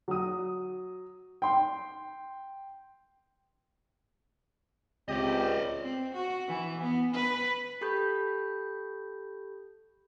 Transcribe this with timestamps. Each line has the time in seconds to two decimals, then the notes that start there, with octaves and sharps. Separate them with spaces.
0.08 F#3 D#6
1.42 G5 C6
5.08 C#2 C4 G4 D5 D#5
5.83 C4
6.15 F#4
6.48 E3
6.82 B3
7.14 B4
7.81 G4 A4 B5 G6